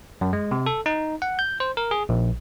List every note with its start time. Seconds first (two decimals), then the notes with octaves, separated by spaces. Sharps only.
0.21 F#2
0.33 G#3
0.51 C3
0.66 A4
0.86 D#4
1.22 F#5
1.39 G6
1.60 C5
1.77 A#4
1.91 G#4
2.09 A#1